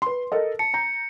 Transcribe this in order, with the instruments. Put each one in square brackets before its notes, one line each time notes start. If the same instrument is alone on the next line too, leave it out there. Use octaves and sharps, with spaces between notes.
[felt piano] B4 C6
A4 A#4 D#5
[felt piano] A5 [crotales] C#7
[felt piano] A#5 G6